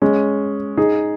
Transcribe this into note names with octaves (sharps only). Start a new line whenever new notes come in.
G#3 C#4
D#4 G#4